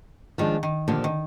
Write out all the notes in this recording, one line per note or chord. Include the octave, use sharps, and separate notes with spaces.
D#3 F3 G#3 D4
D#3
A#2 D3 F3 C4 G4
D#3